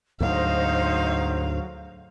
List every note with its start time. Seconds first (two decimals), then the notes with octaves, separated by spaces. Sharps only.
0.20 D2 G#2 F#3 D#4 C5 F5